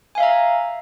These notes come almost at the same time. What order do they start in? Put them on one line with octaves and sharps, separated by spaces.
G#5 F5 E5 A#5